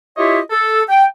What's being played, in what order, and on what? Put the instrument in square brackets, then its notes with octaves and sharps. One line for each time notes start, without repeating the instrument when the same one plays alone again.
[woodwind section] E4 F4 G4 C#5 D#5 E5
A4
G5